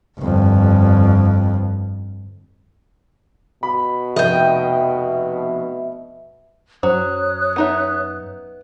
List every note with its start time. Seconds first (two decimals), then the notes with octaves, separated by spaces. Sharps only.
0.19 G1 F2
3.63 B2 B5
4.16 F1 D#5 E5 G5
6.83 F#2 F#3 C5 C#5 D#6 F#6
7.56 B3 D#4 E5